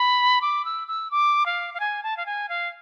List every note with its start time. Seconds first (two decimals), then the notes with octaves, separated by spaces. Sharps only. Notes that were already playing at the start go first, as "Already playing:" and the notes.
Already playing: B5
0.42 D6
0.65 E6
0.87 E6
1.11 D6
1.46 F5
1.74 F5
1.80 G#5
2.03 A5
2.17 F5
2.26 G#5
2.49 F5